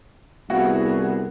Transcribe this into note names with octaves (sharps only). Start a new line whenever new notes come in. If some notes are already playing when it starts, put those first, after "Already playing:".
C2 B3 E4 F#4 G#4 F#5 G5